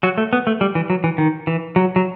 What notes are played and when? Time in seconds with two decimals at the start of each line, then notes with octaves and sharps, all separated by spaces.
0.03 F#3 F#4
0.18 A3
0.33 B3
0.47 A3
0.61 G3
0.75 E3
0.90 F#3
1.04 E3
1.18 D#3
1.47 E3
1.76 F#3
1.96 F#3